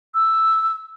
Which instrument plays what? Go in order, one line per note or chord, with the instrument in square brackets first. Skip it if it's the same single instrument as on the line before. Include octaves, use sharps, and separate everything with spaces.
[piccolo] E6